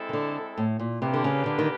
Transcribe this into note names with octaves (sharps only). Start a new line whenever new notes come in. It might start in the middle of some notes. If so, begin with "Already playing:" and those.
Already playing: G#3 C4 E4 A4
D#3
D3
A2
A#2
C3 A#3 D4 G4 B4
D3
C#3
D3
D#3